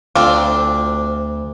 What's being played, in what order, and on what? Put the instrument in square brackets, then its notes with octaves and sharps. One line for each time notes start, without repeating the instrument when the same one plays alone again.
[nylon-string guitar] D2 [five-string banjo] C4 D4 F4 [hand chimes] D6